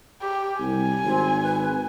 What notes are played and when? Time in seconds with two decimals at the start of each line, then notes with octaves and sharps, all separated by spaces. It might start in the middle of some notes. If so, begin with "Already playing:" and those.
0.21 G4
0.60 C2 G#5
1.04 G#1 C4
1.42 B4